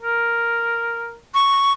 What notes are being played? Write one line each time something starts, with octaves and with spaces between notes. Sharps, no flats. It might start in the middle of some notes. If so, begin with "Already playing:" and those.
A#4
C#6